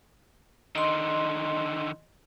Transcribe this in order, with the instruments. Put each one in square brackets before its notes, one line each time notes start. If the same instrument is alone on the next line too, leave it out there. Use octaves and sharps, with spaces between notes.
[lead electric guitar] D3 D#3 [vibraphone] D#5 C6